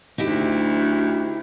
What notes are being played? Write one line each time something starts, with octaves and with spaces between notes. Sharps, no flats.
D2 D#4 E4 G4